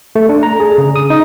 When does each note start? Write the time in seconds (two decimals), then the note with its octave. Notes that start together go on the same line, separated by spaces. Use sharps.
0.15 A3
0.29 D4
0.43 A#5
0.60 G#4
0.78 C#3
0.96 D#6
1.10 D#4